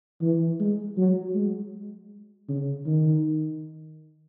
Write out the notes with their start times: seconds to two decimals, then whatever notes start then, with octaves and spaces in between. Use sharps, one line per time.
0.22 E3
0.60 G#3
0.97 F#3
1.35 G#3
2.49 C#3
2.86 D#3